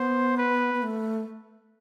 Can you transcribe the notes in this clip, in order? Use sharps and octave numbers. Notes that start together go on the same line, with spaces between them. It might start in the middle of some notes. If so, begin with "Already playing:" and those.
Already playing: B3 C5
B4
B3
A3